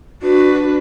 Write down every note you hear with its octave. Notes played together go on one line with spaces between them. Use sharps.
D4 F#4 B4